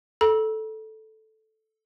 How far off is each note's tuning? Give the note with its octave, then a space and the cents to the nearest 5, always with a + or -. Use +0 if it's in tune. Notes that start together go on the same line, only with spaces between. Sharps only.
A4 -5 A#5 +45